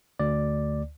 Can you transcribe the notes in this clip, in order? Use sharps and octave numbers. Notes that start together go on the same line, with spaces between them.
D2 D5